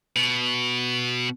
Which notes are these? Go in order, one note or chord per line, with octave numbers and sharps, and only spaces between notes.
B2